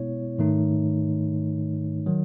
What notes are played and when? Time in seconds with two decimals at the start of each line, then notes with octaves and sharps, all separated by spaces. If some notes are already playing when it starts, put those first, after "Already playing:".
Already playing: B2 G#3 B3 E4 C#5
0.38 G#2 D#3 A3 D#4
2.06 D#3 F#3